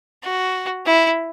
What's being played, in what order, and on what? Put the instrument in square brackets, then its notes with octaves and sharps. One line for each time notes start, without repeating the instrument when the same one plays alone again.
[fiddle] F#4
E4